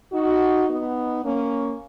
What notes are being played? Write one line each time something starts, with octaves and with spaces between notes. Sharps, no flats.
D#4 F#4
B3 D#4
A#3 C#4